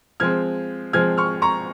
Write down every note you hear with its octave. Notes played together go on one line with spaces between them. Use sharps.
F3 G#3 C4 F6 G#6
F3 G#3 C4 F6 G#6
C#6 F6
A#5 C#6